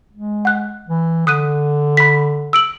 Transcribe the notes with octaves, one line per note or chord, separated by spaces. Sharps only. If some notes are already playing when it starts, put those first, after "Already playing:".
G#3
F#5 F#6
E3
D3 D#6 F#6 D#7
B5 B6
E6 D7 F#7